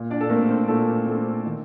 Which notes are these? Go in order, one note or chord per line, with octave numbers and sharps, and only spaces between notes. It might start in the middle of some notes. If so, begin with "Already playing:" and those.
Already playing: A#2
D4 D5
A4
A3 A#3 C4 A#4
C4 C5
A#2 A3 A4
A3 C4
D#3